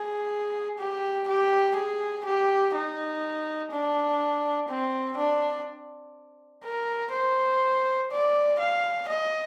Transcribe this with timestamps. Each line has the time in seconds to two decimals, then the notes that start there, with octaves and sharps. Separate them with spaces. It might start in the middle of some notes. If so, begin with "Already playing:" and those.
Already playing: G#4
0.79 G4
1.28 G4
1.76 G#4
2.25 G4
2.74 D#4
3.71 D4
4.68 C4
5.17 D4
6.64 A#4
7.12 C5
8.11 D5
8.59 F5
9.09 D#5